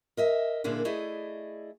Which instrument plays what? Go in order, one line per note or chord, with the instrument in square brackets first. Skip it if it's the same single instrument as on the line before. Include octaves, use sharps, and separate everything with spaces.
[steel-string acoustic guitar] A#4 D#5 E5
A#2 D3 G#3 A#3 D4 E4
A3 E4 G#4 D5 D#5